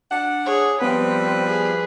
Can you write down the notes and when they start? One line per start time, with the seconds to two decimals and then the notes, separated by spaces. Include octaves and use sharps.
0.11 D4 F#5
0.46 G#4 C#5
0.82 F3 G3 B3 C4 B4
1.47 G#4